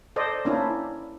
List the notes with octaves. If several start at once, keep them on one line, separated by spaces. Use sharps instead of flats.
A4 C5 D5 D#5
A#3 C#4 D4 E4